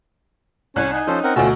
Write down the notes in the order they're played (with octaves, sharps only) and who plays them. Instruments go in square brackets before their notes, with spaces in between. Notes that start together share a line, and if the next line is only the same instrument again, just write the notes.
[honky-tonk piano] C2 F#6 [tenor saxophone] C#4
[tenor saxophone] D#4 [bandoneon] G#5
[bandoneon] F3 A4 C5 [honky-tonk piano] C#4
[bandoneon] C4 A#4 F#5
[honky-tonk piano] D2 B2 [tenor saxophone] A3 [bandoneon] C#4 F4 E6